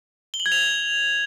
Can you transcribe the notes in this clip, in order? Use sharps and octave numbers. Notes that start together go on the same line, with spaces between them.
G7
F#7
G#6
F7